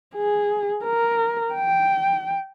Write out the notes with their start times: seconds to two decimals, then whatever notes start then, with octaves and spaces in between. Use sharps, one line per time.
0.15 G#4
0.84 A#4
1.54 G5